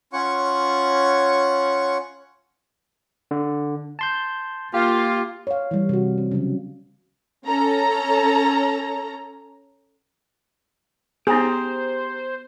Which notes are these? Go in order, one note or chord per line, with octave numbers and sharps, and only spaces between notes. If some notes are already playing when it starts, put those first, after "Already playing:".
C#4 F4 C#5 F#5 C#6
D3
A5 C6 G6
A#3 F4 G4
C#5 F5
E3 G3
C3 F#4
C4
C#3 F#3
C#4 A4 A#5
B3 D#4 G4 G#4 C5 A#5